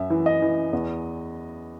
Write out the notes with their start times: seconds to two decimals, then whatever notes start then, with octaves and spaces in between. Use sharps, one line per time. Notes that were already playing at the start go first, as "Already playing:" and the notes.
Already playing: F#2 E5
0.10 E3
0.26 D#5
0.42 E3
0.73 E2